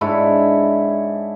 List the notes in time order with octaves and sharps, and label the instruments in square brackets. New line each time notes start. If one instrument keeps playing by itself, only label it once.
[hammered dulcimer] G#2 D4 E4 C#5